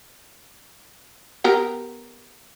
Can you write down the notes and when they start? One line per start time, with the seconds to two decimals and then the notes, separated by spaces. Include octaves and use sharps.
1.44 B3 G4 A#4